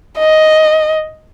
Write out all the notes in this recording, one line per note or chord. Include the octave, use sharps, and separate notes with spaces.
D#5